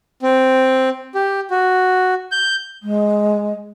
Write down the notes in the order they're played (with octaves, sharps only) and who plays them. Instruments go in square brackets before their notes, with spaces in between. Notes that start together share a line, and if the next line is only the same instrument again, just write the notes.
[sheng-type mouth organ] C4
G4
F#4
G6
[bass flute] G#3